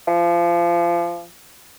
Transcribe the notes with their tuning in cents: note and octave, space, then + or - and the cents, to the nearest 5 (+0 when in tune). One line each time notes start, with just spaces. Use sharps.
F3 -25